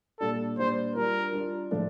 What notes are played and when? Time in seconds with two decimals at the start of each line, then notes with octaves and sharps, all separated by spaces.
0.20 A#2 G3 D4 A4
0.58 A#2 G3 D4 C5
0.95 G3 D4 F4 A#4
1.33 G3 D4 F4
1.71 A2 F3 A3 D4 A4